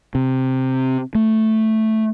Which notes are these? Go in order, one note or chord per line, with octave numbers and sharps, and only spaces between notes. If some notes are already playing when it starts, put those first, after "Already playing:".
C3
A3